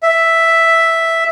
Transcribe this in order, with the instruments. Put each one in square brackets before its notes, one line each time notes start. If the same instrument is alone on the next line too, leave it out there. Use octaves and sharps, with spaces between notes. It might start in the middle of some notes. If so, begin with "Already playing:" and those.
[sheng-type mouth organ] E5